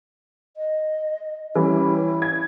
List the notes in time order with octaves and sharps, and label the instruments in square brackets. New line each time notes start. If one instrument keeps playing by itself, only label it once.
[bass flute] D#5
[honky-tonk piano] E3 G3 C#4 [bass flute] E4
[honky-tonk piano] G#6